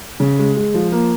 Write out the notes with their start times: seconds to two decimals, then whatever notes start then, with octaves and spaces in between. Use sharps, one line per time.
0.20 C#3
0.38 G#3
0.56 G#3
0.74 F3
0.92 A#3